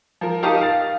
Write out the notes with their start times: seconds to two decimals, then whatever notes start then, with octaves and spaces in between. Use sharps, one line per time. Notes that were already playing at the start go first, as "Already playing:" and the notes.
0.21 F3 A#4
0.43 D#4 G4 A#4 F5 A5 D#6
0.61 F5 A6